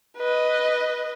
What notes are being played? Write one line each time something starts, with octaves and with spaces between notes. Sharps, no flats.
B4 D#5